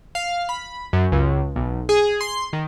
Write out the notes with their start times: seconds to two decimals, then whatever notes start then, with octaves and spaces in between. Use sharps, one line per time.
0.15 F5
0.49 B5
0.93 F#2
1.12 C#2
1.56 B1
1.89 G#4
2.21 C6
2.53 D#3